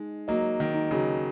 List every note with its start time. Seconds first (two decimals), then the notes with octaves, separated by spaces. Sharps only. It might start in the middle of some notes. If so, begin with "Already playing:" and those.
Already playing: G#3 D#4
0.28 F#3 A#3 D#5
0.60 D#3
0.75 D#4
0.91 C#3 F#3